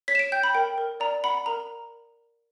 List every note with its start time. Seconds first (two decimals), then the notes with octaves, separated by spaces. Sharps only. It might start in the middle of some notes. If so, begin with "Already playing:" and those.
0.08 C#5 B6
0.15 E7
0.19 D7
0.32 G5 G6
0.43 B5
0.55 A#4 G5
0.78 A#4
1.00 D5 A#5
1.24 F#5 B5
1.46 A#4 A#5